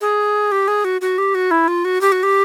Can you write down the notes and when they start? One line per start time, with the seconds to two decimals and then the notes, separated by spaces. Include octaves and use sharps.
0.01 G#4
0.52 G4
0.68 G#4
0.85 F#4
1.01 F#4
1.18 G4
1.35 F#4
1.51 E4
1.68 F4
1.85 F#4
2.01 G4
2.12 F#4
2.23 G4